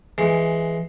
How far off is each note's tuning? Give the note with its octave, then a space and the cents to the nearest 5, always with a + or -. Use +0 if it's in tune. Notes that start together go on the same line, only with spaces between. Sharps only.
E3 +10 G#3 +10